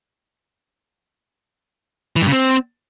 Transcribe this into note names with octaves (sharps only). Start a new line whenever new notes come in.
E3
G2
C#3
C4